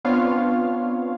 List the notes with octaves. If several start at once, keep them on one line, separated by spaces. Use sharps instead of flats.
B3 C4 D4 F4 C#5 F5